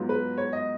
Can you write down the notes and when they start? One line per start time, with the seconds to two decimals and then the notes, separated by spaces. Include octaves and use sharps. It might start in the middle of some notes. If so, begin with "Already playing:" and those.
Already playing: G#2 F#3 B3 F4
0.09 B4
0.38 C#5
0.53 D#5